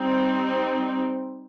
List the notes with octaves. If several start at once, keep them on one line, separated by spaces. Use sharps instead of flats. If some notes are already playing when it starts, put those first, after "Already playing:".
Already playing: G3 C4 D#4